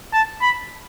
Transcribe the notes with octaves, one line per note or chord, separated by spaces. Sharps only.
A5
B5